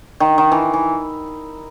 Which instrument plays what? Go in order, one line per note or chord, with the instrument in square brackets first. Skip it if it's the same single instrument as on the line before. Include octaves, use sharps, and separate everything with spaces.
[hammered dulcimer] D#3
D#3
E3
E3